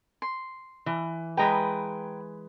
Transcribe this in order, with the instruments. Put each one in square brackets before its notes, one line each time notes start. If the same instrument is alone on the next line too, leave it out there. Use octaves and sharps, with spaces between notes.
[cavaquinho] C6
[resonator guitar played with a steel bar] E3
[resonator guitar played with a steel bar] E3 G#3 B4 [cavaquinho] G5 A#5 B5